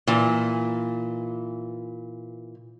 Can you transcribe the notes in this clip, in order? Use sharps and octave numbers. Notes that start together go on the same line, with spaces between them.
A#2 E3